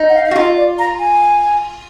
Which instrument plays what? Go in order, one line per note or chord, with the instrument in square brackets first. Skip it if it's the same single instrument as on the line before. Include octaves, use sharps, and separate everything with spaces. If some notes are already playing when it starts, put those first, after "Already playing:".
Already playing: [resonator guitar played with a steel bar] D#4
[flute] F#5
F5
F5
[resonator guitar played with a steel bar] F#4
[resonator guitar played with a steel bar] F4 [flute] D#5
[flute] D5
A#5
G#5